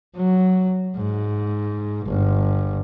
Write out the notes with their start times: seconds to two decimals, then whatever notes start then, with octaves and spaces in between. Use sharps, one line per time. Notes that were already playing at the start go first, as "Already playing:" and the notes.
0.16 F#3
0.97 G#2
2.06 G1